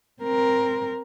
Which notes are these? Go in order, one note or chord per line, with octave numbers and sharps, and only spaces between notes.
C4 A#4